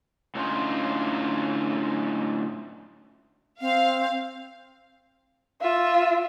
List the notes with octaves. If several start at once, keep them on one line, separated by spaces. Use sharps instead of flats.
A2 D3 C#4 D#4 F4
C4 F5
F4 E5